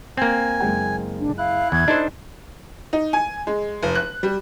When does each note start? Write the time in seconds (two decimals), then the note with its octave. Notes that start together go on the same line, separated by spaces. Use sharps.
0.17 A#3 C4 G#5
0.60 F#1 G#3 G5
1.20 D4
1.38 E4 F5 F#6
1.72 E2 G#6
1.88 D4 D#4 A4 C5
2.93 D#4
3.13 G#5
3.47 G#3
3.83 F1
3.95 F#6
4.23 G3